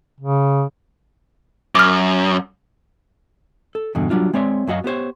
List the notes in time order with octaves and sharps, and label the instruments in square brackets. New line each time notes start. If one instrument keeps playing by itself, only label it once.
[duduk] C#3
[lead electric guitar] F#2 [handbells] D6 F6
[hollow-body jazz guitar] A4
E2 G2 B2 D3
F#3 G3 D4 F4
G#3 C4 C#5 D5 E5
F#2 F#3 F#4 D#5 F5
B3 G4 C5 C#5